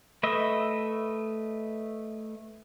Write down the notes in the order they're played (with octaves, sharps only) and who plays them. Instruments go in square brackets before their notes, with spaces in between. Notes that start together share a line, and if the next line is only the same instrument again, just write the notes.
[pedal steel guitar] A3 B4 D#5 E5